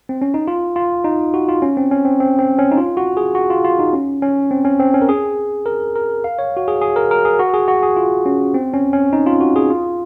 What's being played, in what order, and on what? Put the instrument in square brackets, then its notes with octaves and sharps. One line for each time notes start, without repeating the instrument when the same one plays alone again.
[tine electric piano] C4
C#4
D#4
F4
F4
D#4
F#4
F4
C#4
C4
C#4
C4
C4
C4
C#4
D#4
F4
F#4
G#4
F#4
F4
F4
D#4
C#4
C#4
C4
C#4
C4
C#4
A#4
G#4
A#4
A#4
F5
C#5
F#4
G#4
G#4
A#4
A#4
G#4
F#4
G#4
F#4
G#4
F4
C#4
C4
C#4
C#4
D#4
F4
F#4
G#4
F4